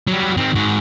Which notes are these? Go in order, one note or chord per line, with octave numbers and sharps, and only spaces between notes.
F#3 G3
D#3 C4
G#2 F#4